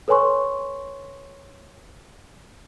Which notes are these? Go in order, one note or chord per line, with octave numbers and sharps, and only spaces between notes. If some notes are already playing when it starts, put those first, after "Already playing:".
A4 B4 C#5 G#5 C6 C#6